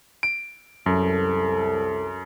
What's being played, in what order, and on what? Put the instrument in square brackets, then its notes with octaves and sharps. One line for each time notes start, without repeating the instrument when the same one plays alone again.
[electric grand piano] D7
[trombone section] C2 A4 [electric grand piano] F#2